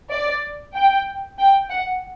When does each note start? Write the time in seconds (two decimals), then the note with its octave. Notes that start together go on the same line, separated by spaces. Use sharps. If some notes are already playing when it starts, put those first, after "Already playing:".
0.11 D5
0.75 G5
1.39 G5
1.70 F#5